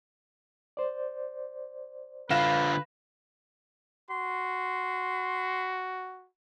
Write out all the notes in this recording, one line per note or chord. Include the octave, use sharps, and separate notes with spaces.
C5 D5
D3 F4 B4 F5 A#6 E7
F#4 C6